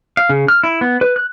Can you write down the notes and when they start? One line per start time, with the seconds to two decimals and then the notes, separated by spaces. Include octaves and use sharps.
0.17 F5
0.29 C#3
0.48 F6
0.63 E4
0.81 B3
1.01 B4
1.16 F#6